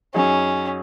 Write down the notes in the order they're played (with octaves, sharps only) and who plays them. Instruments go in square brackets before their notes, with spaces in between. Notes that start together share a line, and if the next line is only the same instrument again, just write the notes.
[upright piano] F#2 F#3 D#4 G#4 [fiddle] C#4